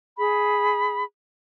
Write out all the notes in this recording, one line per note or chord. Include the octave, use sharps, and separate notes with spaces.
G#4 B5